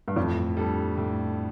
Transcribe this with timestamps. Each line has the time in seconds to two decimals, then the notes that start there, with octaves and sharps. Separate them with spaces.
0.08 G2
0.16 F2 A2
0.57 G3 D4 A4
0.97 A2